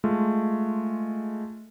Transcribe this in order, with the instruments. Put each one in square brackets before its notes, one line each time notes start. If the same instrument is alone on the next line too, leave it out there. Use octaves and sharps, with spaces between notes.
[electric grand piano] G#3 A3 F4